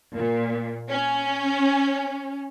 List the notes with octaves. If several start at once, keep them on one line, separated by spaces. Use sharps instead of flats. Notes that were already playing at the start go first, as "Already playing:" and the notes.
A#2
C#4